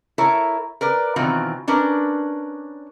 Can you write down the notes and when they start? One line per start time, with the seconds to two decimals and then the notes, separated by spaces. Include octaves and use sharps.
0.18 E4 A4 A#4 C#5 E5
0.81 A#4 B4 D5
1.16 B2 D#3 E3 C4 F4
1.68 C#4 D4 A#4 B4